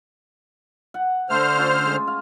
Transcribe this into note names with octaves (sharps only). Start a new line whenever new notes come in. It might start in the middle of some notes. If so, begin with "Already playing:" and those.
F#5
D3 A3 C5 F6
C#4 F4
G#3
F5